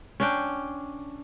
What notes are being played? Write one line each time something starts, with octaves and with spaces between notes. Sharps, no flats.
C#4 D4 G5